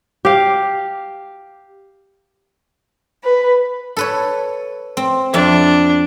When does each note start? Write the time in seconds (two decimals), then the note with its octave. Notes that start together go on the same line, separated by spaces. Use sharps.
0.25 G4 F5
3.23 B4
3.97 A4 B4 C#5
4.97 C4
5.34 F2 D4 E5